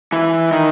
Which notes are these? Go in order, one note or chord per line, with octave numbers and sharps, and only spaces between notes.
E3
D#3